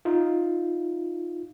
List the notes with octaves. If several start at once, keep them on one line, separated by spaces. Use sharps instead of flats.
D#4 F4